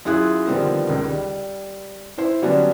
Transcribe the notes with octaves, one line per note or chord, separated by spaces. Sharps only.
F#2 E4 F4 G#4 F#6
D3 D#3 F3 G3 B3 C4
C#2 D#3
G3
E4 C5
D3 F#3 G3 B3 C#4 D4